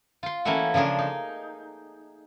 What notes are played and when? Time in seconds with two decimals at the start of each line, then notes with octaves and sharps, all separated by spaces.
0.23 F4 C6
0.45 E3 A3 A#3 C#4 E4 F#4
0.74 C#3 F3 D4 G#4 A#4
0.99 D#4